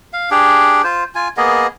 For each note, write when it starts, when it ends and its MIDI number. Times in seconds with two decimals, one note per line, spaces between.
0.13 0.30 77
0.31 0.82 62
0.31 0.82 67
0.31 0.82 68
0.84 1.04 65
0.84 1.04 72
1.15 1.28 65
1.15 1.28 80
1.37 1.67 58
1.37 1.67 59
1.37 1.67 68
1.37 1.67 75